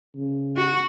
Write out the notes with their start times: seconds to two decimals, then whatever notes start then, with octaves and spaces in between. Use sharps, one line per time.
0.16 C#3
0.57 F#4